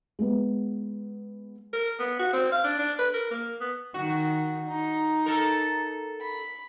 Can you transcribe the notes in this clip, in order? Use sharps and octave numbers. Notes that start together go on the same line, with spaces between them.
G#3 B3
A#4
B3
F#4
C4
F5
D4
D4
B4
A#4
A#3
B3
D#3 F#4
D#4
A4 A#4
B5